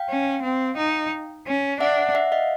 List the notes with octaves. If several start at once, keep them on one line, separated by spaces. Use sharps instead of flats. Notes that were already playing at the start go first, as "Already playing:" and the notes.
Already playing: F5 G5
C#4
C4
D#4
C#4
D4 E5 F#5
E5 F#5
E5 F#5
D#5 F5